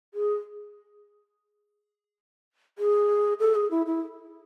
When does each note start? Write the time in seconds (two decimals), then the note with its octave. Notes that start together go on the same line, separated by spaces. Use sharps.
0.14 G#4
2.78 G#4
3.40 A4
3.55 G#4
3.71 E4
3.86 E4